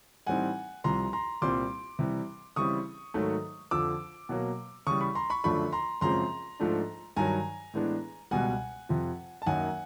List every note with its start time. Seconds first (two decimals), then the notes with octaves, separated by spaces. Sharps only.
0.27 A2 E3 G3 C4 D#4 F#5 G#5
0.84 C2 C3 F3 A#5 C6
1.13 A#5 C6
1.42 C2 A#2 G3 C4 C6 D6
1.99 C3 E3 G3
2.56 C#3 E3 G3 C4 E4 C#6 D#6
3.14 G#2 D#3 F#3 A3
3.71 F2 D3 F3 D6 E6
4.29 B2 F#3 A#3
4.87 C#3 E3 G3 C#6 D#6
5.01 B5 C#6
5.15 A#5 C6
5.30 B5 C#6
5.44 F#2 D3 F3 A3 D4 B5 C#6
5.72 A#5 C6
6.01 F#2 C#3 F3 G#3 C4 A#5 C6
6.59 G#2 F3 A3 D4
7.16 G2 D#3 F#3 G#5 A#5
7.74 A2 E3 G#3 B3 D4
8.31 C#2 B2 G3 F#5 G#5
8.89 F2 C3 F3
9.42 A5
9.46 F#2 D#3 F#3 A#3 D#4 F#5 G#5